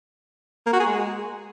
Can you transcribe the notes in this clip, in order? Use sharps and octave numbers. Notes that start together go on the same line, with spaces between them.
A#3
F#4
G#4
G#3